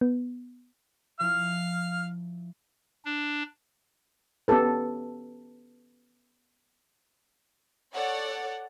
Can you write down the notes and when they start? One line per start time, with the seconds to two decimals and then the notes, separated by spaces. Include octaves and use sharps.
0.01 B3
1.20 F3 E4 F5 F6
3.05 D4
4.48 B3 C#4 G4 A4 B4
7.94 A4 C#5 D5 F#5